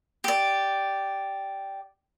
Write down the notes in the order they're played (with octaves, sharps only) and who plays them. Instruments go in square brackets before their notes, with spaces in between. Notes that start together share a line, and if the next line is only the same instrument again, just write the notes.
[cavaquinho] G4 D5